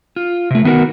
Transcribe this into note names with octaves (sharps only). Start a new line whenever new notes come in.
F4
C3 A3
D#3 B3 D#4 F#4 A#4 F#5